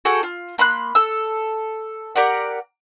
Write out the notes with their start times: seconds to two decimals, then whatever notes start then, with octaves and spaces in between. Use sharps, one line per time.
0.05 F#4 G#4 A4 G5
0.23 F4
0.58 A#3 B5 C6 F#6
0.95 A4 E6
2.16 G4 A#4 D5 F#5